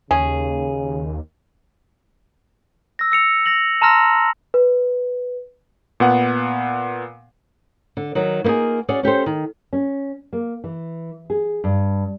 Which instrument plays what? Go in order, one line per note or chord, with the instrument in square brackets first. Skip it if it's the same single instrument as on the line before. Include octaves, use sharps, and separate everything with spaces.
[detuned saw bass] D#2 [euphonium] C#3 [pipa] C#4 G#4
[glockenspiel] E6 A#6
E6 C#7 F7
A#6 F7 F#7
A5 A#5 C6 E6 F6 A#6
[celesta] B4
[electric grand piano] A#2 B3 F#5
[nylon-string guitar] D3
D#3 F#3
A#3 B3 D#4 F4 G#4
C#4 F#4 G#4 D5
C#4 G4 A4 C5
D#3
C#4
A#3
E3
G#4
G2